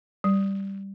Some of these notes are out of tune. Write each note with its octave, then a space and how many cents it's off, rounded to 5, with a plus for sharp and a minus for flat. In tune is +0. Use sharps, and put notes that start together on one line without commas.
G3 +0